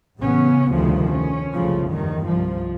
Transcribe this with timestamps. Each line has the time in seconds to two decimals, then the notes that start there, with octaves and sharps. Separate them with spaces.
0.18 A1 C#3 B3 C#4
0.71 F1 D2 D#3 F3 G3
1.11 C#4
1.55 F#1 C2 C#3 F3 A3
1.90 E2 G2 D#3 G3
2.26 C2 F3